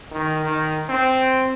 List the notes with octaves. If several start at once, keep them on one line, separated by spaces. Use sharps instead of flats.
D#3
D#3
C4